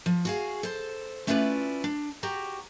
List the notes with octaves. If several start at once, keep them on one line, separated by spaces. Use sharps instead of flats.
F3
F#4 G#4 F5
A4 C5
A3 C#4 E4 F4 B4 D5
D4
F#4 G4 A#5